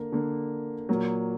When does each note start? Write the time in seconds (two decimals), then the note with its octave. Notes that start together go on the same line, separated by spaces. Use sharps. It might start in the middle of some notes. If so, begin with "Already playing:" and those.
Already playing: D3 A#3
0.12 D3 A#3
0.89 A#2 F#3 A#3